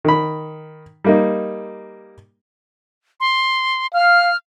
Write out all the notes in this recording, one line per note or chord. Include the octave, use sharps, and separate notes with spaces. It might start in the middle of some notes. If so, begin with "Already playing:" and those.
D#3 B5
G3 A#3 D#4
C6
F5 F6